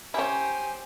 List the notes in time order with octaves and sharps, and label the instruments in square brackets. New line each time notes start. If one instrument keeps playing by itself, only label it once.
[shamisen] C#4 E4 [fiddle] G4 C5 [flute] G#5